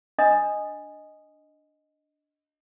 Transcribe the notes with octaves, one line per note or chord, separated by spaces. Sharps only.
D4 D#5 D#6